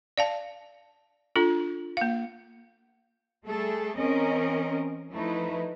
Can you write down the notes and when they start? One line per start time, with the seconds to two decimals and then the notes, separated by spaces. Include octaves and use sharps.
0.18 D5 F5 A5
1.36 D4 F4 A4
1.97 A#3 F5
3.46 G3 A3 G#4 A4
3.98 E3 C4 C#4 A#4 D#5
5.12 F3 A3 D#4 E4 B4